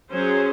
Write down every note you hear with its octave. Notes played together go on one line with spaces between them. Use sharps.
F#3 C#4 G#4 C5